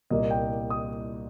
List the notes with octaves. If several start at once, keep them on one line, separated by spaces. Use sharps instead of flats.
C2 A#2 G3 A#3 D#5
G5
D#6